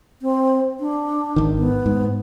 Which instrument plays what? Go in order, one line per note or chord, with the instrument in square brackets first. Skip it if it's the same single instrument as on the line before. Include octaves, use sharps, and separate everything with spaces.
[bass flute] C4
D4
[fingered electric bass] G#1 D#3
[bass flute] B3
[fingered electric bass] G#2